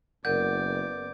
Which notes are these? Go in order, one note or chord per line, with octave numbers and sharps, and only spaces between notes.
F#1 B3 A#4 D5 F#5 G6